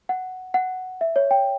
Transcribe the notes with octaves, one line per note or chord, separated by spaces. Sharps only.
F#5
F#5
E5
C#5
G5